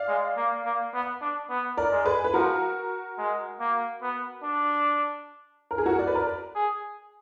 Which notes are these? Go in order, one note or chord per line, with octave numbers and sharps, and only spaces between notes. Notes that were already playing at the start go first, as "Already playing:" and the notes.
Already playing: D5 F5
G#3
A#3
A#3
B3
D4
B3
A#4 D5
G#3
G#4 B4
B4
F3 F#4 A#4
G#3
A#3
B3
D4
A#4
G#4
F#4 A#4
D5
B4
A#4 D5
G#4